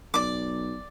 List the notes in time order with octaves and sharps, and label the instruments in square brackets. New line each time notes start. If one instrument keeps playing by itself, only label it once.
[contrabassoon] B1 [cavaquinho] D5 D6